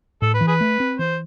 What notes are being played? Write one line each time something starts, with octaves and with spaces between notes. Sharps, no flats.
A2 A4
B4
E3
G#4 B4
A3
C4
E3 C5